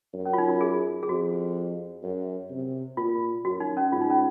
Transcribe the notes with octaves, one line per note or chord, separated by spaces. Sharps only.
F#2
C#4
F4
D#4
F4
G#4
G#4
F2 F#4
F#2
C3
A#2 F4
F#2 F#4
D#4
C#4
G#2 F4
D#4
C#4